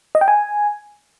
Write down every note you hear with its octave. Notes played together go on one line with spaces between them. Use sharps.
D#5
G5
G#5